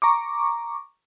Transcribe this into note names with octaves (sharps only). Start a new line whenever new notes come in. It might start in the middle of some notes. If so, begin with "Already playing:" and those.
A#5 C#6 D6